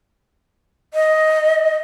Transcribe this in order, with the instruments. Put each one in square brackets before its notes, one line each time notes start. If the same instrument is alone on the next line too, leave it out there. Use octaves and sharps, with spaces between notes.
[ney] D#5